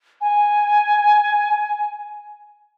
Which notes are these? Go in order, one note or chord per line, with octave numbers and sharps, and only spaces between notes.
G#5